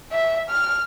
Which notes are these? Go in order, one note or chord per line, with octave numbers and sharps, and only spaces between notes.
E5
F6